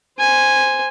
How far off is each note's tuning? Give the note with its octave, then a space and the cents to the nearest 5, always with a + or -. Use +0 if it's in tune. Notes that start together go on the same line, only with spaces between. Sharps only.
C5 +0 G#5 -10